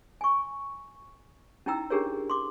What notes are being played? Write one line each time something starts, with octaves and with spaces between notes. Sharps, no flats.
G#5 C#6
C#4 D#4 E4 G5 A#5 E6
C#4 D4 G4 G#4 A#4 C#5
C6 D6